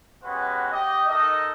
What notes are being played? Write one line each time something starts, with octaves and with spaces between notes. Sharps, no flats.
G#3 B3 C#4 F#4 G4 B4
G4 D#5
D#4 A4 A#4 D#5